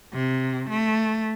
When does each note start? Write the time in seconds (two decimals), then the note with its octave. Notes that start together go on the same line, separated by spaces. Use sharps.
0.13 C3
0.69 A3